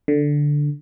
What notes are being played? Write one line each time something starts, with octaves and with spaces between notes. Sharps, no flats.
D3